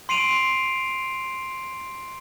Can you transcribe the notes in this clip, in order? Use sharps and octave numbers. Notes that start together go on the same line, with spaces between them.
C6 C7 D7 D#7 F7